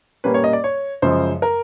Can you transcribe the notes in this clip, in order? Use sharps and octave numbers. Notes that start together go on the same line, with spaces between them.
A#2 G3 A#3 C#4 B4
C#5
D#5
D5
C#5
F#2 C#3 F3 G#3 C5
A#4